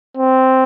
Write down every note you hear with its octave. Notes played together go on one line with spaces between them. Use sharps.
C4